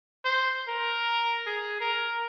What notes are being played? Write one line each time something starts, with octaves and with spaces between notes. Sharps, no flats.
C5
A#4
G#4
A#4